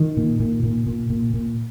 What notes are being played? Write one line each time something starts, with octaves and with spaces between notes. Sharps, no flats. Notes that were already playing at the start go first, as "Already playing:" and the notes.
Already playing: D#3
A#2
A#2
A#2
A#2
A#2
A#2